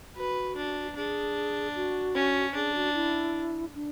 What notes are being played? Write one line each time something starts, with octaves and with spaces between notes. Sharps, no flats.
F#4 B4
D4
D4 G#4
F#4
C#4
D4 G#4
F#4
E4
D4